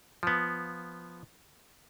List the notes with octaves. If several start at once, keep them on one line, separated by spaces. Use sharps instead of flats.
F3 B3